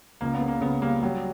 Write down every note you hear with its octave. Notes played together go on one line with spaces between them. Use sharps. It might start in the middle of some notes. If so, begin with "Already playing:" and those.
C#2 A#3
B3
C#3
A#3
C#3 B3
G3 A#3
F#3 G3